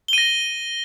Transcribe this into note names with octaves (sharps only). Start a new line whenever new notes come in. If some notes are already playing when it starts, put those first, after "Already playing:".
A#6 D#7 G7